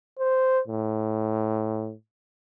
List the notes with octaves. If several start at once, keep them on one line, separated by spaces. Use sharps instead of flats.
C5
A2